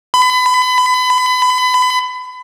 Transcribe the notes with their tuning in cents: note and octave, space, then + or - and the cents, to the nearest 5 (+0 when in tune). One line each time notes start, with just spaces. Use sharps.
B5 +30